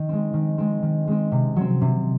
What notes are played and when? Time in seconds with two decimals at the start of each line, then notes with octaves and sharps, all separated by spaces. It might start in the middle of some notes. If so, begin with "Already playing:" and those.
Already playing: D#3
0.09 G#3 C4
0.33 D#3
0.58 G#3 C4
0.83 D#3
1.07 G#3 C4
1.32 C3
1.56 F#3 C4
1.81 C3